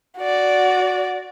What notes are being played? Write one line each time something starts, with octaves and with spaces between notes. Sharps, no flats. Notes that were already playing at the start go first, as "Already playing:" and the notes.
F#4 D5